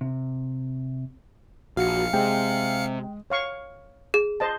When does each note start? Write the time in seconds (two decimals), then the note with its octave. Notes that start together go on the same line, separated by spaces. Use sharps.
0.01 C3
1.77 A#1 F#4 F5 C#7
2.13 C3 G#3 G5
3.30 C#5 F5 C#6
4.14 G#4
4.40 C5 D#5 A5